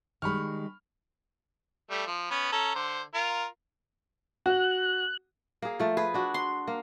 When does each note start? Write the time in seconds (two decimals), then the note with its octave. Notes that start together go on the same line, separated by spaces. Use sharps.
0.22 D#3 G3 G#3 B5 C#6 F6
1.90 G3 A3
2.07 F3
2.31 B3 C#4 B4
2.52 C#4 A4 A#5
2.75 D3 C5
3.14 F4 A#4
4.46 F#4 F#6
5.62 A#3 G#4
5.80 F3 A3
5.97 G#4 B4
6.14 D4 F#4
6.34 C6
6.68 A#3